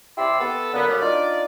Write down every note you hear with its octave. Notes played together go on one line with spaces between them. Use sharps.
C3 E4 G4 D5 C6 E6
B3 A4
F#2 D3 A#3 B3
F#2 G3
D4 D#4 F4 D5